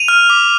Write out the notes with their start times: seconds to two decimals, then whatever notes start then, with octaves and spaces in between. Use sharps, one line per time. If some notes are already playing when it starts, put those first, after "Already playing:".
Already playing: D#7 F7
0.08 F6
0.30 D6